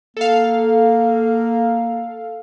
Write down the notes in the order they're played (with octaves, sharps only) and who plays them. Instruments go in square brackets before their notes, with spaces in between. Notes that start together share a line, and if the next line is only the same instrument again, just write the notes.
[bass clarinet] A#3 [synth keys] A4 F5